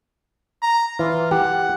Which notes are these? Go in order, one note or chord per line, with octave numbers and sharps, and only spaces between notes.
A#5
E3 F4
G4 F#5